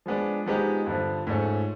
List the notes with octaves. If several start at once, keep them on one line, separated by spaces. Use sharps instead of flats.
F3 G#3 B3 D4
F3 G#3 B3 D#4 G4
G2 D3 F3
G#2 F3 A3 C#4